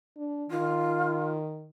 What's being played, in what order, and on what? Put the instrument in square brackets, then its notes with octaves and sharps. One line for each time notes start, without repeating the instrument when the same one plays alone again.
[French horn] D4
[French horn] D#3 [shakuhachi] F4